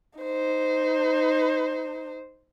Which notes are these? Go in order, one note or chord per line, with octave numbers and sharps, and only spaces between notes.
D#4 C5